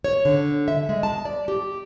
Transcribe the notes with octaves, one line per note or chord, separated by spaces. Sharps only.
C#5
D3
E5
G#3
A5
D5
G4